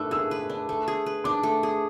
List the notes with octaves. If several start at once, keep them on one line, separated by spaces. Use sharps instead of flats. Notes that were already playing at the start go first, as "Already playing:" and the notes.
Already playing: A3 D4 B4 E6 F#6
G#4 E6
B4
D4
A3
G#4
B4
D4 D6
A3
G#4